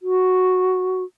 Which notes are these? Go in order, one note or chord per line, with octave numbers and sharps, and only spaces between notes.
F#4